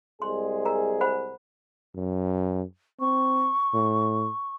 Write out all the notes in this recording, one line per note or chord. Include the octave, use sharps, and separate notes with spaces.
C2 G#3 G#4 C6
A#4 A#5
C5 F#5 B5
F#2
C4 C#6
A2